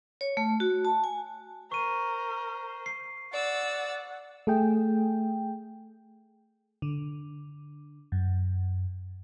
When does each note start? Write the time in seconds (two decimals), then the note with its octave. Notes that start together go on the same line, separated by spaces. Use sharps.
0.21 C#5
0.37 A3
0.60 F#4
0.85 A5
1.04 G#5
1.72 A#4 C5 C#6 D#7
2.86 C7
3.34 D5 F#5 E6 A6
4.47 A3 G#4 G5
6.82 D3
8.12 F#2